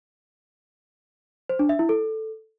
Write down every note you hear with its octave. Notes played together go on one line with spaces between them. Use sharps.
C5
D4
E5
E4
A4